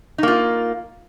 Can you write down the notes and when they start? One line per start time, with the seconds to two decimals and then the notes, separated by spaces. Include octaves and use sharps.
0.18 D#4
0.23 A#3
0.28 F4